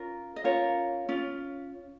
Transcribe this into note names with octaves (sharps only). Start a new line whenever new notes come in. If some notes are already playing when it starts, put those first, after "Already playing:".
Already playing: C#4 F4 A#4
D#5
C#4 F4 A#4 C#5
C#4 F4